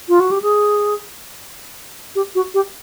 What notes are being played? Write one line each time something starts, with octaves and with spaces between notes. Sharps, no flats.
F4
F#4
G4
G#4
G4
F#4
G4